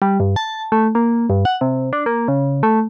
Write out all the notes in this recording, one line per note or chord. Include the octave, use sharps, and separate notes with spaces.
G3
G2
A5
A3
A#3
G2
F#5
C3
D4
A#3
C#3
A3